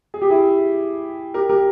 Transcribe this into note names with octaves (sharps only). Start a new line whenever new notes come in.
G#4
G4
E4 G#4
G4 A#4
G4 A#4